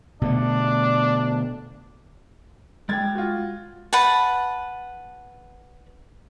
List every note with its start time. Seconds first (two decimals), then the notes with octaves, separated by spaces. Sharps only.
0.22 B2 D3 A3 D4
2.89 G#3 G5 G#6 A6
3.15 F4 F#4
3.93 B4 F#5 A5